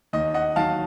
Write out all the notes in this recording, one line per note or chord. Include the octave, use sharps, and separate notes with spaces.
D#2 D#5
D#5 F#5
D#3 F#3 F5 A5